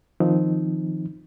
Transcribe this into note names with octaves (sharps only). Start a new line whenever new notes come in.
D#3 F3 C4 D#4